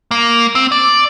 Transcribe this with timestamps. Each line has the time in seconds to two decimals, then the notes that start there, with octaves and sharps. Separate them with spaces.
0.11 A#3
0.55 C4
0.72 D5